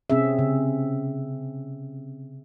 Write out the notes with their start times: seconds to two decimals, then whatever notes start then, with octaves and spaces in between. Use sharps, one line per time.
0.10 C3 C4 C#4 G#4 E5
0.39 C#3